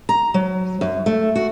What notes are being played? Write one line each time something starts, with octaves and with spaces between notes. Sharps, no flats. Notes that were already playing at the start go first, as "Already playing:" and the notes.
A#5
F#3
F#2
A3
F#4